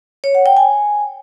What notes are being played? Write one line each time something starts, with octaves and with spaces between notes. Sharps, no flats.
C#5
F#5
G5
G#5